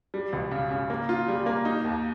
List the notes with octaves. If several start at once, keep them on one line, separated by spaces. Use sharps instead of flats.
G3
C#2
C#3
C#3
A#3
F4
G3
A#3
D#4
D#2